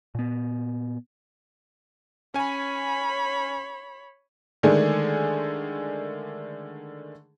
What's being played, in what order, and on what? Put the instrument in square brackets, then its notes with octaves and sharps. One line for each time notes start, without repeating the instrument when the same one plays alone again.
[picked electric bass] A#2 B3
[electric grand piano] C#4 G#5 [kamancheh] C#5 B5
[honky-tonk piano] D3 D#3 G#3 A3 D4 G#4